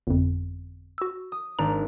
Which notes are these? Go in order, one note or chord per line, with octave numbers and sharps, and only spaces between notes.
G1 F2
F#4 E6
D#6
G#1 D4 A#5